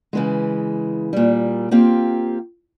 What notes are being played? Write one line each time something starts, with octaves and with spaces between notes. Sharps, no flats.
C#3 E3 G#3
A#2 G3
A#3 C4 F4 G4